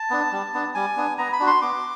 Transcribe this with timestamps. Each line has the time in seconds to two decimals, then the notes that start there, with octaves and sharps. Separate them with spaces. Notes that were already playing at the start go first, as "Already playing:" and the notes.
Already playing: A5
0.10 B3 D4
0.32 G3
0.54 B3 D4
0.75 G3 G#5
0.97 B3 D4
1.18 B3 A#5
1.33 B5
1.40 D4 F#4
1.47 C6
1.62 B3 D6